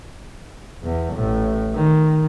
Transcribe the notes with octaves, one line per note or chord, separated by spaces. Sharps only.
E2
A1 A2
D#3